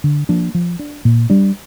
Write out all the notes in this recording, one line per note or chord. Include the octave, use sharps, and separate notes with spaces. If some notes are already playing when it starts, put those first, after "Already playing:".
D3
F3 A#3 D4
F3
D4
A#2
G3 D4